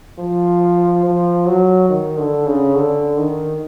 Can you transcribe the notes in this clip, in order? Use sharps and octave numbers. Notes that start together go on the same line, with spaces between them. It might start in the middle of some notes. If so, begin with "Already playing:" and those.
F3
F3
F#3
D#3
D3
C#3
D3
D#3